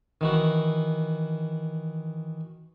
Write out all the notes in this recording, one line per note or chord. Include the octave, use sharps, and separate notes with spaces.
D#3 E3 F#4